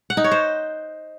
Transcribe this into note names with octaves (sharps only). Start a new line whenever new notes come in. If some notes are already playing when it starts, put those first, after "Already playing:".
F#5
D#4
C#5
C5